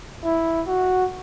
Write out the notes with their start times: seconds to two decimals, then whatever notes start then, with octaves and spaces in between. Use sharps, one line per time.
0.24 E4
0.67 F#4